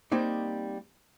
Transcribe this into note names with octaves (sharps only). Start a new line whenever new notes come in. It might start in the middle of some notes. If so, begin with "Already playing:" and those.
G3 A#3 C4 D#4